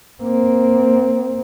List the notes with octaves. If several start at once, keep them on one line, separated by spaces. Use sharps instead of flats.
A#3 C4